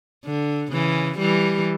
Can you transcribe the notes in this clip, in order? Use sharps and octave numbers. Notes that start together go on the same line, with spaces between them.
D3
C#3 E3
E3 G3